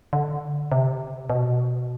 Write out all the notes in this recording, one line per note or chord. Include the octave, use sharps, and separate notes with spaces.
D3
C3
B2